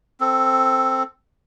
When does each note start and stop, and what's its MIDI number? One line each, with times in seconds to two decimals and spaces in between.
0.20 1.03 60
0.20 1.03 69